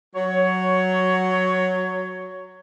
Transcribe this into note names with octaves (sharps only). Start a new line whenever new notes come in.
F#3 C#5